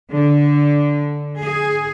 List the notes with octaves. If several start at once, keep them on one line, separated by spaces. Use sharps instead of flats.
D3
G#4